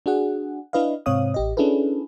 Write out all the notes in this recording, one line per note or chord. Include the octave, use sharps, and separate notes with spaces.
D4 F#4 G#4 F#5
D4 E4 B4 D#5 F5
G#2 C3 C4 C#5 F5 D#6
A1 G4 D#5
C#4 D4 E4 G#4 A4 B4